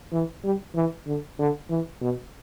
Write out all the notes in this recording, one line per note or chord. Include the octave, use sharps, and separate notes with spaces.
E3
G3
E3
D3
D3
E3
B2